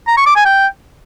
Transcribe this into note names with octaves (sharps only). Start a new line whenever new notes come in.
A#5
C#6
D6
G#5
G5